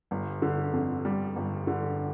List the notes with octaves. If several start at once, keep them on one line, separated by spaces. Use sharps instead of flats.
G1
D3
F2
G3
G1
D3